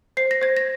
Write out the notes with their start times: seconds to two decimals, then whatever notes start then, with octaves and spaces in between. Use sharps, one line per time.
0.17 C5 C7
0.31 A#6
0.41 C5 G#6
0.57 A#6